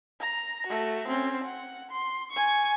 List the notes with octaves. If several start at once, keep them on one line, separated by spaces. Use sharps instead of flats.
A#5
A3 F#4
C4 C#4
F#5
C6
G#5 C#6